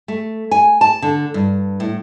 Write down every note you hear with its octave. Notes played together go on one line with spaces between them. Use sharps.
A3
G#5
A5
D3
G2
A2